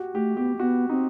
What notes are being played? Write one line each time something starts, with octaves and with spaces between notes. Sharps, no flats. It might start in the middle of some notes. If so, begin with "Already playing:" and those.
Already playing: F#4 G4
A3 G4
B3 G4
A3
B3 F#4
C4 D#4